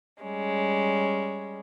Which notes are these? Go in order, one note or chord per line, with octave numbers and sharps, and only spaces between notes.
G3 G#3 C#4